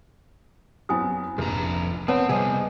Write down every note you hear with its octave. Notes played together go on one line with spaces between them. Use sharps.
F#2 B3 C4 E4 G#5 D#6
F1 A#1 F2 A#5
B3 C4 C#5 A5
C3 G3 G#4 C5 D#5